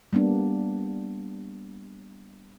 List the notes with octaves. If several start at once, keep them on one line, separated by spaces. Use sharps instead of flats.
G3 A#3 B3 D4